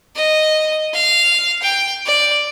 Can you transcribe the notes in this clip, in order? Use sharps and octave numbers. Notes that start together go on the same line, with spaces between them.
D#5
F5
G5
D5